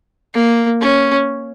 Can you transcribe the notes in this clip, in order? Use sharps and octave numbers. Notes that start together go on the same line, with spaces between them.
A#3
C#4